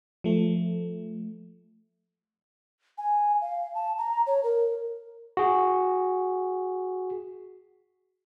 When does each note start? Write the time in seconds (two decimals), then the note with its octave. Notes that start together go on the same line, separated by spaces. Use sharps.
0.24 F3 A3
2.98 G#5
3.41 F5
3.75 A5
3.98 A#5
4.27 C#5
4.44 A#4
5.37 F#4 G#4